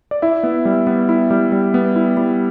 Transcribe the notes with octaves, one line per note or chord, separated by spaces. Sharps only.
D5
E4 E5
B3
G3
B3
E4
G3
G3
B3
E4
G3